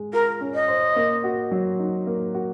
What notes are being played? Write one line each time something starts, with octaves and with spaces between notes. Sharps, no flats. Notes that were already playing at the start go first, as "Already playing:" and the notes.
Already playing: G#3
F4 A#4
C#4
D#5
C5
A#3
F#4
F#3
D#4
A#3
F#4